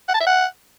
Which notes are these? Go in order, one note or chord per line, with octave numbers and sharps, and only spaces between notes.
F#5
A5
E5
F#5